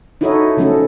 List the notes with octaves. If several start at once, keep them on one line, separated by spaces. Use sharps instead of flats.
D#4 E4 F#4 A4 C#5 D#5
C#3 F3 A3 C#4 A4